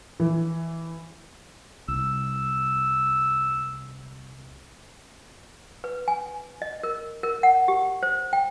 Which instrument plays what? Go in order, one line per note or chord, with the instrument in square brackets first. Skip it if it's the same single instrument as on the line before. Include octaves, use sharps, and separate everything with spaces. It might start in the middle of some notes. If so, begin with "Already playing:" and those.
[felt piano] E3
[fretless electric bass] C2 [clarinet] E6
[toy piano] B4
G#5
D#5
A#4
A#4
F#5
G4
C5
G5